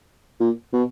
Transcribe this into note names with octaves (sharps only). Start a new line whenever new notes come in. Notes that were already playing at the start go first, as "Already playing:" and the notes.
A#2
B2